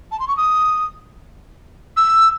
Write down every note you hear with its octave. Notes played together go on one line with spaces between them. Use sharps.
A5
C6
C#6
D#6
E6